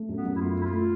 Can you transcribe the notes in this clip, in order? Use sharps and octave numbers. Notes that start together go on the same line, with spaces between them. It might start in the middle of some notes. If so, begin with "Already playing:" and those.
Already playing: A3
F#2
B3
F#2
E4
A3 F4
A3 E4
F4
A3